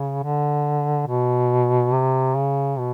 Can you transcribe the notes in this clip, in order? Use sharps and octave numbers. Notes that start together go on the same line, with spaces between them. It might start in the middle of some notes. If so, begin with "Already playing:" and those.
Already playing: C#3
D3
B2
C3
C#3
B2